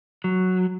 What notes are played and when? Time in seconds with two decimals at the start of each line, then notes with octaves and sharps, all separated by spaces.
0.24 F#3